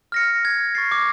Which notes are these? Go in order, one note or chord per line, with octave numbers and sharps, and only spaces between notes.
F6 A#6 C#7
G#6
C#6 A6 C7
D6